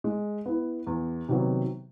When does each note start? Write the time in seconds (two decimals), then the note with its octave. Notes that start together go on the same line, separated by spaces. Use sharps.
0.04 G#3
0.46 B3 E4
0.87 E2
1.28 C3 D#3 F#3 B3